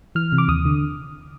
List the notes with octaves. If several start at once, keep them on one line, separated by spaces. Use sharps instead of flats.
E3 F6
C3
D6
D#2 D#6
D3